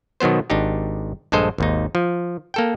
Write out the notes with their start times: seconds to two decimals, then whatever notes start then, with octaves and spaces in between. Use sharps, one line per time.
0.20 B2 D#3 F#3 B3 C5
0.50 G#1 D4 D#4 G4
1.32 A#1 G2 G#3 A4 C5 D#5
1.58 G#1 D#2 D#4
1.95 F3
2.54 A#3 A4 G5